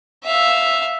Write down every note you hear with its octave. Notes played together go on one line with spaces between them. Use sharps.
E5 F5